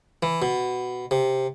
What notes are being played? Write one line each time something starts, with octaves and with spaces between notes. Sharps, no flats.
E3
B2
C3